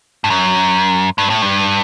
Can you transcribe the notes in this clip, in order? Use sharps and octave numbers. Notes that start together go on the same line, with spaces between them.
G2
F#2
G2
A2
G2